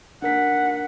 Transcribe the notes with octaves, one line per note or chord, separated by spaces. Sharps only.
D4 A#4 F#5 B6